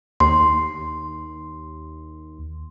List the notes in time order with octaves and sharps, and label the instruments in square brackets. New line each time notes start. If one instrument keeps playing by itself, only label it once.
[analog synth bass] D#2 [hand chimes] C6